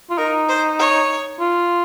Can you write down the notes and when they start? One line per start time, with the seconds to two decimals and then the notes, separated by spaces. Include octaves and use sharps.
0.10 F4
0.18 D#4 A#4
0.49 C5
0.79 C#5
1.40 F4